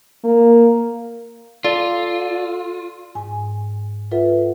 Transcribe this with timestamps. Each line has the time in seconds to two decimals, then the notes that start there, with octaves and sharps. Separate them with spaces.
0.24 A#3
1.64 F4 A4 D5
3.15 G#2 G#5
4.11 F4 A4 B4 E5 F#5